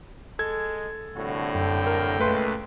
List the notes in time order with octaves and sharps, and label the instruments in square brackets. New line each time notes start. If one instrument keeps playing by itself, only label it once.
[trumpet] G#3 [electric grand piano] A4 G#6
[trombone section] C2 A2 D3 [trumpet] F#4
[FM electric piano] F#2 [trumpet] G5
[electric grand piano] A#4
[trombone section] C#2 A#2 [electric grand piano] A3 B4 C6